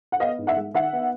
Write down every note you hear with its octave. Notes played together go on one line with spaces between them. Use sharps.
F#5
B3 D#5 F5
G#2
E5 F#5
G#3
D#3 E5 F#5
B3